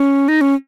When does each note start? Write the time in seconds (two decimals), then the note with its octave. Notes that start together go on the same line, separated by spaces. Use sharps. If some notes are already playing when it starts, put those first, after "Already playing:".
Already playing: C#4
0.28 D#4
0.41 C#4